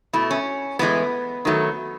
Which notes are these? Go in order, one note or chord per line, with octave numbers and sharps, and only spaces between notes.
B2 A3 E4
C#4
A2 E3 G#3 B3
D#3 F#3 A3